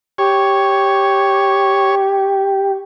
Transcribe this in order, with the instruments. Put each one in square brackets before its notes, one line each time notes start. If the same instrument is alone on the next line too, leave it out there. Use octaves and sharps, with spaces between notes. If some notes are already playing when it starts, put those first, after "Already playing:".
[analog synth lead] G4 [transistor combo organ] C#5